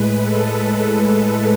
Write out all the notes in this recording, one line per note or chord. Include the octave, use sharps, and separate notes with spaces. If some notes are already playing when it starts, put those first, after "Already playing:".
Already playing: A2 G#3 B4
A4